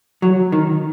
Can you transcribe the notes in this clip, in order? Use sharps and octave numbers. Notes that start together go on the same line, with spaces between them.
F#3
D#3